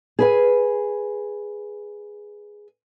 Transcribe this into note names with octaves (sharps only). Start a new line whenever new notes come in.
G#4 B4 G#5